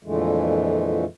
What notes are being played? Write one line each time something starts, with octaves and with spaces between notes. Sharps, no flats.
F2 A#2 D3 E3 G#3 A3